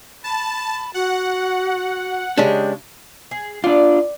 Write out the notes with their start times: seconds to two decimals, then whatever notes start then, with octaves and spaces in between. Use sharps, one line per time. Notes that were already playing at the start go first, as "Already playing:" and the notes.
0.24 A5 B5
0.94 F#4 F#5
2.37 C#3 G#3 D4 G4
3.31 G#4
3.64 D4 F4 D5